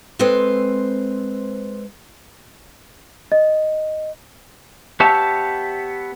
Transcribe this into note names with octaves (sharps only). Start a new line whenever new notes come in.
G#3 C4 A4 B4 C5
D#5
B3 G4 C#5 E5 A5